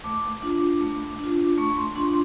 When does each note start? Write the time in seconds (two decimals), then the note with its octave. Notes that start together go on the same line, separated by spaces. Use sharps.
0.04 A3 D6
0.42 D4 F4
0.81 A3
1.19 D4 F4
1.58 A3 C#6
1.77 C6
1.96 D4 F4 C6